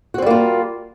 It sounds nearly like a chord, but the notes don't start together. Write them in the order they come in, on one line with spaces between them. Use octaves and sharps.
F#4 C4 G3 A#3 F4